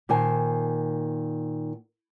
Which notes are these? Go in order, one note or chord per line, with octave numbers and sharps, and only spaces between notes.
A#2 D#3 C5 G#5 A5